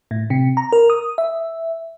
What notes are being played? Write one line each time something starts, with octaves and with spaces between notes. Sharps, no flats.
A2
C3
A#5
A#4
D#6
E5